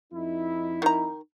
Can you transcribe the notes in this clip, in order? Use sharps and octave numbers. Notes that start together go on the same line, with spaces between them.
F2 D#4 E4
D#3 A#5